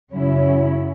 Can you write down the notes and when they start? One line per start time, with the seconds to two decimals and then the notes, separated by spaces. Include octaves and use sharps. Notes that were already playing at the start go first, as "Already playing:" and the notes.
0.10 F#2 C#3 F#3 C#4 E4